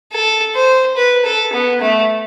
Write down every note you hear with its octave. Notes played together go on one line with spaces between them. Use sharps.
A4
C5
B4
A4
B3
A3